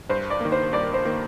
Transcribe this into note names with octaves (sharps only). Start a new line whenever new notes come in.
G2 C5
D5
D#3 A#3
C5
G2 D5
C5
D#3 A#3